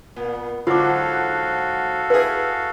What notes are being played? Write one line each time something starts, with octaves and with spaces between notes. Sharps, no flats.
A#2 B3
G#2 D3 F#3 F4 F#4 A4 F5 D6
E4 G#4 B4